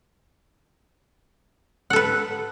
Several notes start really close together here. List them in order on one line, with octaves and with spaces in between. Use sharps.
F#5 A4 B4